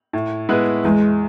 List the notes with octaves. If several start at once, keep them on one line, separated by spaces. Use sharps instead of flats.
A2
G#3 B3 E4 B4
E2 G#3